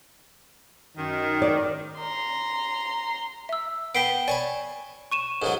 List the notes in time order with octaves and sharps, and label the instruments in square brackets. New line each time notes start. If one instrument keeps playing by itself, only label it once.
[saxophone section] F#2 D#3
[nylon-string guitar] D5
[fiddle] A#5 C6
[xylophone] E5 E6
[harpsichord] B3 G5 A5 [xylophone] B6 C7 D7
[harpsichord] C#5 A5 B5 [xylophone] D5 G#5
[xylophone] C#6 D#7 E7
[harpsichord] G#2 C#3 F#3 [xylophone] G#4 A#4